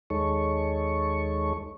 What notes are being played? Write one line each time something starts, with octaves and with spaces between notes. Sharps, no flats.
D#2 G#3 D#4 A4 C#5 C#6